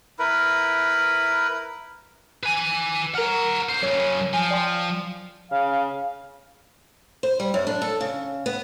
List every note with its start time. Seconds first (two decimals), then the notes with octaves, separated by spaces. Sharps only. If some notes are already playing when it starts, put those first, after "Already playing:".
0.19 E4 A#4 B4 B5
2.43 B4 G#5
3.15 A#4 F#5 A#5 F6
3.69 B1 C5
3.83 F#2 C#3 C#5
4.33 F3 G#5
4.51 D5 G5 C6
5.52 C#3 F5
7.23 C5
7.40 G3
7.54 F#2
7.67 D4
7.82 A4
8.01 C#3
8.46 B3